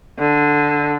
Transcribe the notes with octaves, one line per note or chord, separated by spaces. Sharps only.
D3